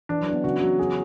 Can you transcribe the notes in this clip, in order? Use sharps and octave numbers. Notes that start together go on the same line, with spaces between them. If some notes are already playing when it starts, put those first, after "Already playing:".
E3 D4
F#3
D4
B3
C#3 F#4
F#3
G#4